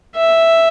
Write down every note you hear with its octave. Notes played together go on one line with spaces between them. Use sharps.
E5